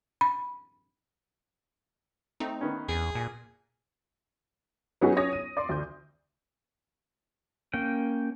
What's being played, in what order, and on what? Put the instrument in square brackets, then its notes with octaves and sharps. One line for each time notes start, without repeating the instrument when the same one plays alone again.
[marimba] B5
[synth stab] A3 C4 D#4
[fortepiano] D#3 B3 C#4
[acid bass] E2 [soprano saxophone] G#4
[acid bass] A#2 [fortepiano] G#5
[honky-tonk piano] F#3 B3 C#4 D#4 F#4 G#4
C#4 C#5 D#6 A#6
D#7
D5 C6
D2 G6
[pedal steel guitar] A#3 C#4 G5